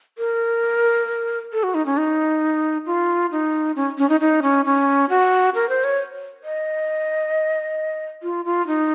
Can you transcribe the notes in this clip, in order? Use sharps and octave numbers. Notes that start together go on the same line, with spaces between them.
A#4
A4
F#4
D#4
C#4
D#4
F4
D#4
C#4
C#4
D#4
D#4
C#4
C#4
F#4
A#4
C5
C#5
D#5
F4
F4
D#4